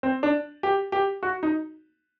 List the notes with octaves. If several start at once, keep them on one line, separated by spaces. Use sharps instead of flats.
C4
D4
G4
G4
F#4
D#4